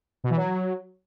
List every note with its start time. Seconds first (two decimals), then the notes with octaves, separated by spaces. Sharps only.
0.24 B2
0.30 E3
0.37 F#3